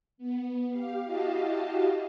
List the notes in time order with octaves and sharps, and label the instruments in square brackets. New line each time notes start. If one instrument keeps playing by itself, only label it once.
[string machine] B3
G4 F5
E4 F#4 G4 D#5 F5 A5